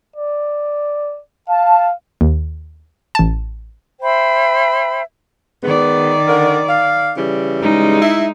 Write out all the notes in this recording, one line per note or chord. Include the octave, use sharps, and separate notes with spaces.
D5
F5 A5
D#2
A1 A5
C5 E5 G5 B5
D#3 G#3 B3 D5
D3 A#4
F5
C#3 E3 G3
G#3 D#4
E4 E5